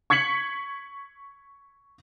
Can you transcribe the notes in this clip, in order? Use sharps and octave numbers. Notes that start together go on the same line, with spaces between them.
C#6 G#6 B6 C#7 F#7